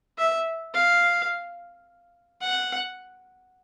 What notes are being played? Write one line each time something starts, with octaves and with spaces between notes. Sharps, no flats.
E5
F5
F#5